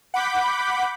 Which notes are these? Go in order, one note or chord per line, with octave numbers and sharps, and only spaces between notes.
F#5 B5 D6 G6 B6